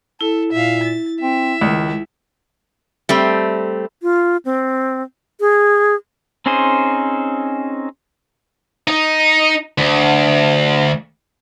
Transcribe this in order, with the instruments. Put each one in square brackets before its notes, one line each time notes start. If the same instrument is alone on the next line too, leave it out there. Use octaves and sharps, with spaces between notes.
[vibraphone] E4 [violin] A4
[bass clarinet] A#2 [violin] E5 F5
[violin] A6
[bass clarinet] C4 [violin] E5
[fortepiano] C#2 [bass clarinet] D#3
[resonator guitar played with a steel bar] G3 A3 C4
[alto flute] F4
C4
G#4
[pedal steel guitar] C4 C#4 D#4 G#4 C5
[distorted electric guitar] D#4
D2